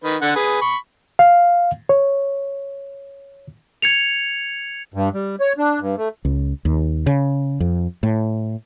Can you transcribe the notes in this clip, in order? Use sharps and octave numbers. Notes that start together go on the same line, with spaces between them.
D#3 B4
D3 F#5
G#4 B4
B5 C#6
F5
C#5
G#6 C#7 F7
G2
G3
C#5
D4
G2
A3
C#2
D#2
C#3
F2
A2